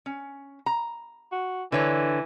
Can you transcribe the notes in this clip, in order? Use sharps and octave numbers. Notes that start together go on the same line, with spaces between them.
C#4
A#5
F#4
D3 E3 B4 C#5